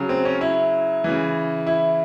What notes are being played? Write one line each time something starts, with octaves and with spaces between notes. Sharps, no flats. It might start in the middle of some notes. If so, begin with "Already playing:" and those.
Already playing: C#3 F#3
C4
C#4
E4
C#3 E3
E4